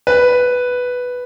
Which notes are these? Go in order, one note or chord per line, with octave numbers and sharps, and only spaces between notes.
B4